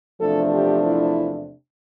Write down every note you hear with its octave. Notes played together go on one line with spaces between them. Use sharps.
E2 C3 F3 A3 D4 A4
G4
E4